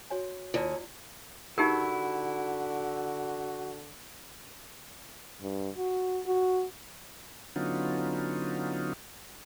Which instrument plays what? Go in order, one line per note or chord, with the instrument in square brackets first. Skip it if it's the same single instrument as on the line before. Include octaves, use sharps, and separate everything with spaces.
[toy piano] F#4 C#5 G#5
[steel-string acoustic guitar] D#2 [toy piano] E4 F4 D5
[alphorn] D3 [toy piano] D#4 G4 A#4 [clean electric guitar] E4 [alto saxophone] F#4
[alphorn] G2
F#4
F#4
[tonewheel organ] D3 F#3 B3 C#4 D#4 F4